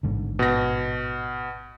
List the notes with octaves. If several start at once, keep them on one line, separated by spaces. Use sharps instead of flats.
A1 G#2 D3
B2 A#6